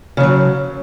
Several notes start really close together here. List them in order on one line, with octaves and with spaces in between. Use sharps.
C#3 F3 F#3